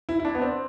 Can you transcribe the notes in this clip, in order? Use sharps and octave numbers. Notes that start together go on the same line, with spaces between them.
E4
E4
D4
B3
C4